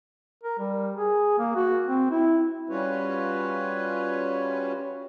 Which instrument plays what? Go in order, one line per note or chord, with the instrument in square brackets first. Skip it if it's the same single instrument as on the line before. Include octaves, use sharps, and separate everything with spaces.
[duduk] A#4
G3
G#4
A#3
F#4
C4
E4
[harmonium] G3 C#4 F4 F#4 B4 C#5